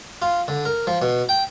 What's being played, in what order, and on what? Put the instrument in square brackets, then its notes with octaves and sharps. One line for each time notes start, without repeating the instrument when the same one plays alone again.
[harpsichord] F4
D3
A#4
F3
B2
G5